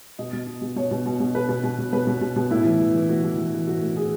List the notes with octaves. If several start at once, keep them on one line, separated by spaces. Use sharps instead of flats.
B2 D#5
B2
B2
B2
B2 C#5
B2
B2
B2
B2 B4
B2
B2
B2
B2 B4
B2
B2
B2
A2 E4
E3
E3
E3
A2 F#4
E3
E3
E3
A2 F#4
A2
E3 G#4